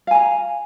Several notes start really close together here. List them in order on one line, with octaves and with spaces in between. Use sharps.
F5 G#5 A#5